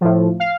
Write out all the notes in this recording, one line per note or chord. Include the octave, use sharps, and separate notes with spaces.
A2 F3
F5